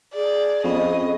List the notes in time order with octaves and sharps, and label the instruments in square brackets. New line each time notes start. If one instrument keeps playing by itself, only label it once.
[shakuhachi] G#4 [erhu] D5
[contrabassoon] F2 [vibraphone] B3 C#4 [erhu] D#5